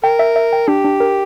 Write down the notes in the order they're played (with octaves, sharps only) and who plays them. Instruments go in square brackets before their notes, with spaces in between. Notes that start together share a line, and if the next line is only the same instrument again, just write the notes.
[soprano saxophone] A#4 [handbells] G5
[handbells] E5
E5
G5
[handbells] D4 [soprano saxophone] G4
[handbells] D4
A#4